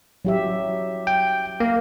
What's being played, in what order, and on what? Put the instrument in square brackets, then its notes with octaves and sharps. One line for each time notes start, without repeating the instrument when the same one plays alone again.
[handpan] F#3 G4 E5
[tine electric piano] G5
A#3